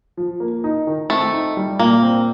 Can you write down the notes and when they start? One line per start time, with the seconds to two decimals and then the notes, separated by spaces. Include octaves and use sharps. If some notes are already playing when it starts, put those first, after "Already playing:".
0.17 F3
0.40 A#3
0.64 D#4
0.87 D#3
1.10 A3 C4
1.33 D#4
1.57 G3
1.79 A#2 A#3
2.03 C4